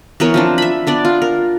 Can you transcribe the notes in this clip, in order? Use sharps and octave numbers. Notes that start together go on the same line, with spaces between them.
E3 B3 A#4 C#5
F3 C4 D4
E5 B5
B3 D4 D5
F4
A#4